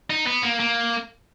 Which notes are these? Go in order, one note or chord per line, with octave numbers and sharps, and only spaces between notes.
D#4
B3
A#3
A#3